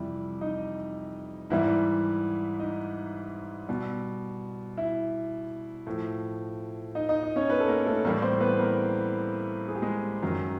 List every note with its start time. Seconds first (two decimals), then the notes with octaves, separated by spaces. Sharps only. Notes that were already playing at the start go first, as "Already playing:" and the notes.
Already playing: F2 C3 E3 G3 E4
0.41 D#4 D#5
1.50 G#2 E3 G3 E4 E5
2.60 D#4 D#5
3.69 B2 G3
4.77 E4 E5
5.87 A2 F3
6.95 D#4 D#5
7.09 D#4 D#5
7.23 D#4 D#5
7.36 C#4 C#5
7.50 B3 B4
7.60 A4
7.68 A#3 A#4
7.86 A3 A4
8.04 A2 E3 G3 A#3 A#4
8.22 C4 C5
8.40 B3 B4
8.59 A#3 A#4
9.68 G#4
9.75 G4
9.82 G#3 G#4
10.22 F#2 D#3 F#3